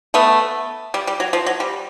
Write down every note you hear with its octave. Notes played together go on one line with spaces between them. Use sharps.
A3 B3
G3
G3
F#3
F3
F#3
G3